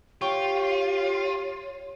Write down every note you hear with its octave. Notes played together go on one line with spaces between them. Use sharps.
F4 G4 C#5 G5 C#6